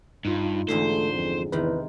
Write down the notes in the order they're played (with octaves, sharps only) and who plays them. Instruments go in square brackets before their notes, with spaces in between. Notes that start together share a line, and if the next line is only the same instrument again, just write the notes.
[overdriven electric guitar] G2 [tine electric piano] D#4 F4
[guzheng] E2 G#2 D3 [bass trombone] A3 [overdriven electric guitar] C5
[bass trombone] F2
[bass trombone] E2 [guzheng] C3 D#3 [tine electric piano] B4